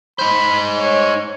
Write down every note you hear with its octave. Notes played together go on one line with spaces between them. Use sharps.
D#4 C5 B5
C#5